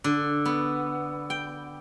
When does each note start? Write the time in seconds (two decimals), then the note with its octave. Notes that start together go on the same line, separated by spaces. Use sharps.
0.04 D3
0.46 B3
1.30 G5